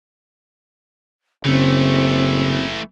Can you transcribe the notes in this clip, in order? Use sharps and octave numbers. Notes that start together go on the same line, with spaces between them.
F#1 C#3 E3 A3 C4